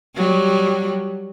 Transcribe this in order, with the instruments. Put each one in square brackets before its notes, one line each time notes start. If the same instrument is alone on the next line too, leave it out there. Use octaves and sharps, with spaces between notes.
[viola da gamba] F#3 G3